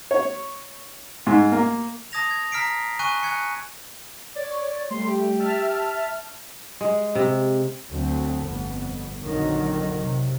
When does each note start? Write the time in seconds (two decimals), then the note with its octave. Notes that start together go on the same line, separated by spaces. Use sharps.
0.11 C#5
1.26 G#2
1.52 A#3
2.12 A5 D#6 G#6 A#6 F7
2.31 G#6
2.52 A#5 F6 B6 C7 D7
2.99 G#5 C#6 F#6 D#7
3.23 G#5 F#6 G#6 C#7
4.36 C#5 D5
4.90 G3 A3 C6
5.06 G4
5.39 E5 A5 F6
6.81 G#3
7.15 C3
7.91 D2 F#3 A3 C4
8.45 G1 F2 B3
9.22 A#1 F2 D3 D#3 F#3
9.98 C3